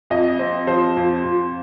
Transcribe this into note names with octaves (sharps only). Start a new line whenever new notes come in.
F2 D#5
C4
F3 C5
F2
F2